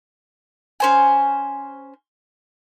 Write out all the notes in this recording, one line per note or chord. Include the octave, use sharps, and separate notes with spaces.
C#4 C5 G#5